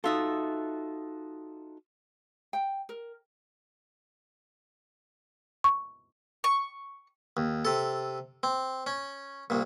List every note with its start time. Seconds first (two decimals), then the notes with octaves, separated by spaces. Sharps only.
0.04 D#4 F4 F#4 A4 E5 D#6
2.53 G5
2.89 A#4
5.64 C#6
6.44 C#6
7.37 D#2
7.65 C3 A4
8.43 C4
8.87 C#4
9.50 C2 A#2